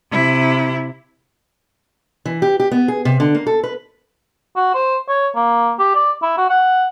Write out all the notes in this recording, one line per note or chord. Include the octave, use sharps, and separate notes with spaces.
C3 E4
E3
G4
G4
B3
G#4
C3
D3
A#3
A4
B4
F#4
C5
C#5
A#3
G4
D5
E4
F#4
F#5